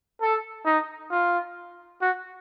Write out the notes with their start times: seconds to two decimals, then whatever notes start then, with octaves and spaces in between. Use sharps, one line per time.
0.21 A4
0.65 D#4
1.11 F4
2.02 F#4